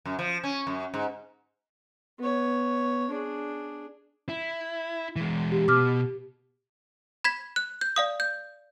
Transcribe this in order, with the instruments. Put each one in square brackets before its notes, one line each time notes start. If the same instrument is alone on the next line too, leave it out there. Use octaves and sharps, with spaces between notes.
[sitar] F#2
F3
C#4
F#2
G#2
[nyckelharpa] B3 C#5
D4 G#4
[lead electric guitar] E4
E3 G#3
[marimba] G4
[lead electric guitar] B2 [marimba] D6 F6
[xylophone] B5 G#6 B6
F#6
G6
D5 F5 D#6
G6